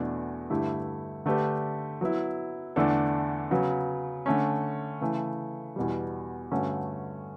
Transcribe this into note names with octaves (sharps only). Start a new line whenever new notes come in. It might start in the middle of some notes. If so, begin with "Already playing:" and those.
Already playing: E2 B2 A3 D4
G2 D3 A3 E4 G4
D3 A3 D4 G4 B4
F#3 B3 E4
E2 D3 A3 D4 A4
C#3 F#3 B3
D3 A3 C#4
C#3 E3 A3
E2 B2 G3
G2 D3 A3 C#4 F#4